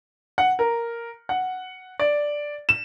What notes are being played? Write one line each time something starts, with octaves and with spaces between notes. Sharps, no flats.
F#5
A#4
F#5
D5
E7